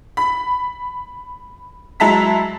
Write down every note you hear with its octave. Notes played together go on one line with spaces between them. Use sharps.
B5
F#3 G#3 E4 A5 A#5 B6